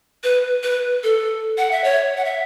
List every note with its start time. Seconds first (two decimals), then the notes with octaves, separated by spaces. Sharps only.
0.24 B4
0.63 B4
1.04 A4
1.58 F#5
1.72 E5
1.84 C#5
2.17 F#5
2.25 E5